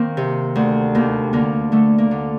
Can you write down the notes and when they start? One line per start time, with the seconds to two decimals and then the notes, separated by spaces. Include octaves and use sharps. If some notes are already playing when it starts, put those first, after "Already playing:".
Already playing: D#3 A#3 C4
0.17 C3
0.55 D2
0.95 D#2 A#3
1.33 D3 A#3
1.72 D3 A3
1.98 A#3
2.11 D3